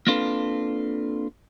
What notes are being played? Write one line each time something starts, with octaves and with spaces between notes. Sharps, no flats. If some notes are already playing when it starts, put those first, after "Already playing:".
A#3 C4 D4 F4 A4 B4